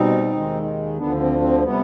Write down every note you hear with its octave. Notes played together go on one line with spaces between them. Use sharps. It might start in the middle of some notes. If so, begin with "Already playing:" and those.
Already playing: B2 G3 C4 D#4
D#2 D#3 G#3
D2 D3 F3 B3 D4
C4
C4
C3 G3 B3